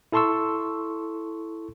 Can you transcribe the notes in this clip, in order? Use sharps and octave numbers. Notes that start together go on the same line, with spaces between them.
E4 A4 A5 C6 C#6 E6